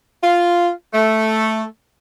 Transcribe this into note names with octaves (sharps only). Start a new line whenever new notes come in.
F4
A3